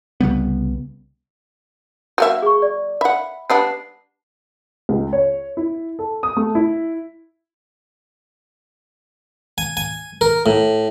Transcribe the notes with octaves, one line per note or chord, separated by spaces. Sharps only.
C2 C#3 G3 B3
F#3 A#3 E5
G#4 C#6
D5
E5 F#5 B5
G3 B3 D4 C7
C#2
C#5
E4
A4
D#6
A3
E4
G#5
G#5
A#4
A2